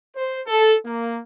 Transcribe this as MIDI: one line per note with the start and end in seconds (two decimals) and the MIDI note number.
0.16 0.41 72
0.47 0.76 69
0.85 1.20 58